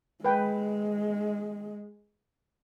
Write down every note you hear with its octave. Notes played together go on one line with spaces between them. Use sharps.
G#3 B4 G5